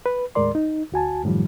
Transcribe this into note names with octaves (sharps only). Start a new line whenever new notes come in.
B4
D#2 A2 G#3 A#4 D5 C6
D#4
D2 F#4 G#5 A5
F#2 A2 D#3 F3 G3